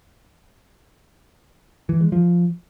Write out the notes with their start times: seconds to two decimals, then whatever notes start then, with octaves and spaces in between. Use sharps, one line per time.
1.89 E3
2.01 G#3
2.12 F3